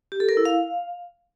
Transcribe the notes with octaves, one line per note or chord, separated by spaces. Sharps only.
G4
A4
A#4
E4
F5